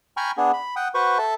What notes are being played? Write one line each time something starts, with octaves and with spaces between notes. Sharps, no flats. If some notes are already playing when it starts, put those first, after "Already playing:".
G5 G#5 A#5 B5 C#6 F6
B3 D4 G#4
B5
F#5 G5 D#6
F#4 B4 C5 C#6
A4 E5 A5